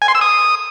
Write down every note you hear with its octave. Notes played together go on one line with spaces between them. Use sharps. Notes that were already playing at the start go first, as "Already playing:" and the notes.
G#5
C6
E6
D#6